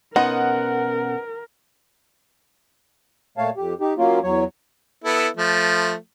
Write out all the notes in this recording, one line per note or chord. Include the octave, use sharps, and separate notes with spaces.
B2 B3 C#4 D#4 A#4 D#5 F#5 C6
A#2 A3 C#5 F5 A5
F2 G4
D#4 G4
F#3 A#3 C#4 F4
E2 F#3 C#5
B3 E4 A4
F3 A3